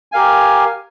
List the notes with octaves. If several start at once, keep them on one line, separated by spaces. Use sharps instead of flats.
G4 A#4 F5 G#5